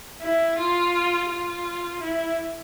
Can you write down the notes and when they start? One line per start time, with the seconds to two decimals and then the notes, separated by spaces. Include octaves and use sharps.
0.22 E4
0.58 F4
1.30 F4
2.02 E4